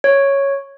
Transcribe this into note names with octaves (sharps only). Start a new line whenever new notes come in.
C#5